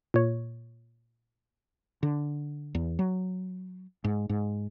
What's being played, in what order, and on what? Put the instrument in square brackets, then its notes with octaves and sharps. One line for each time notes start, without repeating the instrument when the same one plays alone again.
[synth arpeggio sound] A#2 C#5
[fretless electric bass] D3
E2
F#3
G#2
G#2